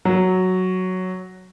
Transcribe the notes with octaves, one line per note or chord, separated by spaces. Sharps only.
F#3